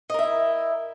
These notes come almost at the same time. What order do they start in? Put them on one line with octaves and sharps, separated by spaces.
D#5 A#4 E5 E4